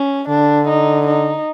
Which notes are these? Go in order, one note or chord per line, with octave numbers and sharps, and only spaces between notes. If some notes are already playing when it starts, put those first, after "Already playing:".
Already playing: C#4
D3 D4
D#4
D#4